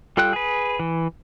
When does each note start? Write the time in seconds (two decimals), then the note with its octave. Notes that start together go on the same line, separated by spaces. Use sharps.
0.17 G3 F4 A4 G5 F#6
0.33 G#4 B4
0.80 E3